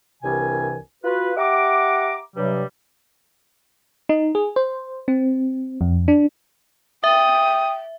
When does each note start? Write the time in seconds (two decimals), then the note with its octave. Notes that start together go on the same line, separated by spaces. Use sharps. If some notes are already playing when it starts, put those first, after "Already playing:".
0.23 C2 G2 C3 E3 A#4 G#5
1.04 F4 F#4 B4
1.37 G4 E5 F#5 A#5 D6
2.35 G2 C3 F#3 G3
4.09 D#4
4.35 G#4
4.56 C5
5.08 C4
5.81 F2
6.08 D4
7.04 E5 G5 D#6